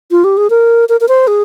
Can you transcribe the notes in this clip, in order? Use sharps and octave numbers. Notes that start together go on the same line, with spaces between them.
F4
G4
G#4
A#4
A#4
A#4
C5
G#4